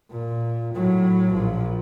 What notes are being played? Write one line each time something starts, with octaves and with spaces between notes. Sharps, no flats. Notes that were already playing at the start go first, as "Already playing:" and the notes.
A#2
A2 F#3
A#1 F3